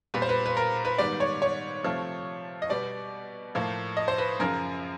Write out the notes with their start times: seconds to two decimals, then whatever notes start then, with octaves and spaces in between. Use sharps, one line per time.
0.14 A#2 G3 B3 B4
0.22 C5
0.29 B4
0.46 B4
0.57 A#4
0.85 B4
0.98 G#2 D#3 G3 B3 D5
1.20 C#5
1.42 C#5
1.84 C3 F3 A3
2.62 D#5
2.69 B2 G3 B3 D5
3.55 A2 F3 A#3
3.97 D#5
4.08 C5
4.18 B4
4.39 F#2 C#3 F3 A#4